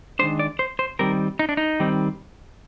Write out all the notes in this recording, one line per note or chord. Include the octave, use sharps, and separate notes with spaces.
D#3 G#3 D4 C5
D5
C5
C5
D#3 G3 C4 A#4
D#4
D4
D#4
D#3 G3 C4